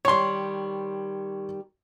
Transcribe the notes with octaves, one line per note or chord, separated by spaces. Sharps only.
D#3 G3 C#5 C6